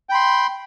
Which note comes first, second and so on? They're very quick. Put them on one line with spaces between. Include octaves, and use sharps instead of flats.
G5 B5 C6